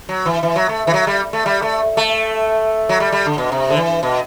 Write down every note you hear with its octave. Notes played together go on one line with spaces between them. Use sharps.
F#3
E3
E3
F#3
A3
E3
F#3
G3
A3
G3
A3
A3
F#3
G3
G3
D3
B2
C3
D3
E3
B2